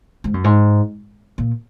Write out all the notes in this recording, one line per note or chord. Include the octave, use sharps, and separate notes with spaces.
G#2
F#2
G#2
A#2